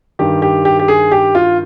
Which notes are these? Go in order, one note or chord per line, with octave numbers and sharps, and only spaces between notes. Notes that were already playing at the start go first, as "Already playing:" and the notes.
G2 D#3 G4
G4
G4
G4
G#4
G4
F4